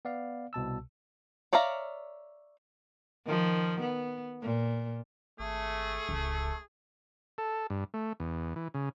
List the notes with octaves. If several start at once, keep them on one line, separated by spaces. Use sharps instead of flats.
B3 D5 F5
C2 B2 A5 E6
C#5 D5 E5 F5 A#5
D#3 F3
B3
A#2
G#1 A3 G#4
D1 C#2
A4
G2
A3
E2
E3
C#3